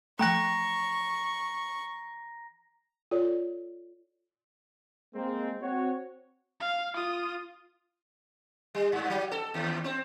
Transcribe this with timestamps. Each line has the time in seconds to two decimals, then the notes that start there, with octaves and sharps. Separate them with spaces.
0.19 E3 F3 A3 G5 A#5 C#6 F#6 A#6
3.11 F4 A4 C#5 D5
5.15 G#3 A#3 C4
5.61 C4 F#4 C#5
6.60 F5
6.94 F4 D#6
8.75 G3
8.92 G2
9.10 F#3
9.32 A4
9.54 D#2
9.84 C4